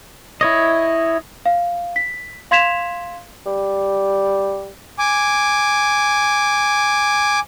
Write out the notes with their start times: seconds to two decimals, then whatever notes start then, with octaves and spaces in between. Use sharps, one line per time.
0.41 E4 C#5 D#5
1.46 F5
1.96 B6
2.51 F5 C6 G#6 B6 E7 F7
3.46 G3
4.99 G#5 D6